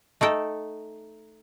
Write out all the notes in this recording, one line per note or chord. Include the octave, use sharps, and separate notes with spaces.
A3 D#4 A4 G5